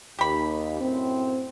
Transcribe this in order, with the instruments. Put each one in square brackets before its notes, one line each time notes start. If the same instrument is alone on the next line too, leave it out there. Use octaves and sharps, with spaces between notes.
[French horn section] D#2 [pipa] G4 B5
[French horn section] F#2 A2 C4